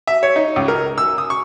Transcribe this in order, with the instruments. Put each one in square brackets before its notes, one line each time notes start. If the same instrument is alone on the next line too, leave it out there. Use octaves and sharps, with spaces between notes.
[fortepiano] E5
C#5
D#4
C#2
A#4
E6
D#6
C#6